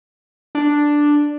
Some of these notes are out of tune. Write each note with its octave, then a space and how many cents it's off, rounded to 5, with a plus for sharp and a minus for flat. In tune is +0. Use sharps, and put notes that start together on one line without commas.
D4 +0